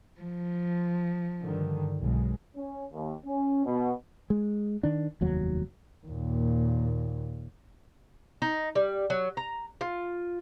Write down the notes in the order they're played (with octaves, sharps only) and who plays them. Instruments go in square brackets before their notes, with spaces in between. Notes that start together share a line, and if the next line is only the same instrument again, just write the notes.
[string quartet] F3
[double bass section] G2 D3 D#3
B1 G#3
[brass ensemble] C#4
D#2
C#4
B2
[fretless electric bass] G#3
D#3 D4
F1 D#2 F#3
[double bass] D#2 A#2
[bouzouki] D#4
G3
F#3
A#5
F4